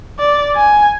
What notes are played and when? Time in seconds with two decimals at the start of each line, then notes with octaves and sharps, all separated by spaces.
0.19 D5
0.57 G#5